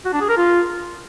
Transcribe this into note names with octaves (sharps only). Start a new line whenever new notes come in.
F#4
D4
G#4
A#4
F4